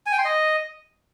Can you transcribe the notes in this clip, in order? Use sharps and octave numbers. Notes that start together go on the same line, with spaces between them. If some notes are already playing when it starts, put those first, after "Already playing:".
G#5
G5
C6
D#5